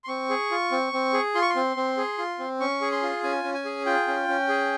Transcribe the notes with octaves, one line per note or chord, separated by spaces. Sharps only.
C6
C4 C#6
G#4
F4
C4
C4
G#4
F4 C6
C#6
C6
C4
C4
G#4
F4
C4
C#4 C#6
G#4
C6
F4
C#4 G#5
C#4
G#5
G#4
F4 G5
C#4
C#4
G#4